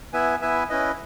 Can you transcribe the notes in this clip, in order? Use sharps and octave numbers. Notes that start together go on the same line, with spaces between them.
B3 E4 B4 E5 G#5
B3 E4 B4 E5 G#5
C#4 E4 B4 D#5